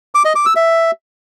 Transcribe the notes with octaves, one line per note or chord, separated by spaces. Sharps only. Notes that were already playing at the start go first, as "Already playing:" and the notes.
D6
D#5
D6
E6
E5